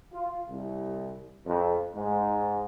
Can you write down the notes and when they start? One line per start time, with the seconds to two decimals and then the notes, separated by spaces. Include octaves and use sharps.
0.13 F4
0.49 C2
1.45 F2
1.95 G#2